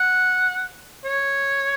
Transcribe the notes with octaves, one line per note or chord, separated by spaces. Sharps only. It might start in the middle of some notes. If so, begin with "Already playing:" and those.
Already playing: F#5
C#5